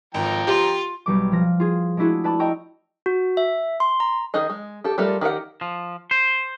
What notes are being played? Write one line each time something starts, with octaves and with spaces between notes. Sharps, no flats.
G#1 F3 G5 A#5
F4 G4
B1 G3 D6
F3 F6 A#6
F4 G#4
G#3 A3 D4 E4 F#4 G#4
B4 D5 A5 B5 D6 A6
D#5 G5 A#5 C#6 E6
F#4
E5
C6
A#5
D#3 D#4 G#4 D#5
G#3
G4 A4
G3 A3 F4 A4 A#4
D#3 G4 A#4 F#5
F3
C5